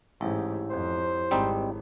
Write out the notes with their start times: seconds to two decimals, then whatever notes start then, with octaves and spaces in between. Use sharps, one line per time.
0.21 A1 G#2 E4 G4 C#5
0.71 F2 C5
1.31 G#1 G3 C4 D#4